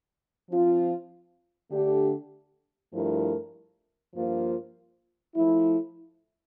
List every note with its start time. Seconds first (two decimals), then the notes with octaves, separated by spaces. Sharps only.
0.50 F3 C4 F4
1.71 D3 A3 D4 G4
2.93 G2 F3 A3 E4 A#4
4.14 G2 F3 A#3 F4 C5
5.36 F3 A3 E4